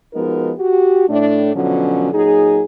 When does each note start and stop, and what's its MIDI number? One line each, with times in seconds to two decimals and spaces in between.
0.14 0.51 53
0.14 0.51 56
0.14 0.51 59
0.14 0.51 63
0.14 0.51 66
0.14 0.51 70
0.58 1.07 66
0.58 1.07 67
1.08 1.50 45
1.08 1.50 57
1.08 1.50 62
1.54 2.12 47
1.54 2.12 50
1.54 2.12 53
1.54 2.12 54
1.54 2.12 61
2.13 2.62 46
2.13 2.62 54
2.13 2.62 63
2.13 2.62 68